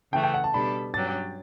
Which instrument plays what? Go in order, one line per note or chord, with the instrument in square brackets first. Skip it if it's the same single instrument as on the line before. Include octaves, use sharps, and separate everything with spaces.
[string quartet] C#3 E3 A3 [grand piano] G5
[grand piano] G5
F#5
A5
[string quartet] B2 G3 D4 A4 [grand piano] B5
[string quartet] G2 F#3 C#4 G4 [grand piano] A6